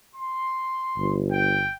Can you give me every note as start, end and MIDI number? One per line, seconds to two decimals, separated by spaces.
0.16 1.16 84
0.97 1.68 31
1.32 1.73 79